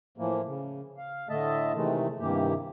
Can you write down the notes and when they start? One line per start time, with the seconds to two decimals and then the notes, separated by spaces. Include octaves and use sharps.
0.18 A2 E3 F3 A#3
0.46 C#3
0.97 F5
1.29 A2 D3 A3 D#5 E5 A5
1.75 C3 D#3 E3 G#3 A3
2.19 G2 C3 D#3 E3 A#3 G4